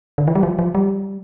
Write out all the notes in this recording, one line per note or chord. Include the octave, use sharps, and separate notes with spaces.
D3
E3
G3
F3
F3
G3